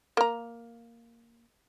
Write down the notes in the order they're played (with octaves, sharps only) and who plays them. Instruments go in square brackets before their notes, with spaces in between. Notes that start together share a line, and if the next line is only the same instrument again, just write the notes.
[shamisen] A#3 A#5